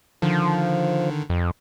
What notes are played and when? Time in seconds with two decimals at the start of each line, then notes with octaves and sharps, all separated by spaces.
0.22 D3 D#3 F3
1.30 F2